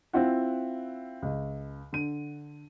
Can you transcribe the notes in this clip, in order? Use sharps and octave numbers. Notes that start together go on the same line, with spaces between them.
C4 E4 F4 F#5
C#2
D3 D#7